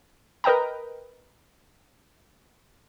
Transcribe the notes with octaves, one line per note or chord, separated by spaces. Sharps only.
A#4 B4 D#5 G5 A#5